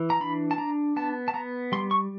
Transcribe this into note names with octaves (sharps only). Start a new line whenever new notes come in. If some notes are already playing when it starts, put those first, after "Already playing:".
Already playing: E3
A#5
D4 B5
A5
D4 A#5
B3 A5
A5
B3 A#5
G3 C6
C#6